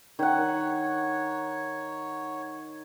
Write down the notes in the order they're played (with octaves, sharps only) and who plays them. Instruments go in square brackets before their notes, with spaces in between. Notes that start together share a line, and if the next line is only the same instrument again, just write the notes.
[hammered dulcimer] D#3 F#5 [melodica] C#5